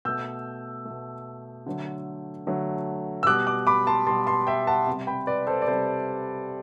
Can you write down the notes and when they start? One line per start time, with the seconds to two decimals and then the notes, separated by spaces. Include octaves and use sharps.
0.05 B2 A3 E6 G6
0.85 B2 A3
1.66 D3 F#3 A3
2.47 D3 F#3 A3
3.23 E6
3.27 B2 G3 D6 F#6
3.47 D6 F#6
3.67 B5 D6
3.87 A5 C6
4.07 B2 G3 A5 C6
4.27 A5 C6
4.47 E5 G5
4.67 F#5 A5
4.87 C3 G3
5.07 G5 B5
5.27 B4 D5
5.47 A4 C5
5.62 D5
5.67 C3 G3 A4 C5